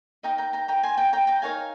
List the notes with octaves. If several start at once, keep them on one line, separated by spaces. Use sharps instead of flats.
D#4 A#4 D#5 G5 A#5
G5 A#5
G5 A#5
G5 A#5
G#5 C6
G5 A#5
G5 A#5
G5 A#5
D#4 A#4 C#5 F5 G#5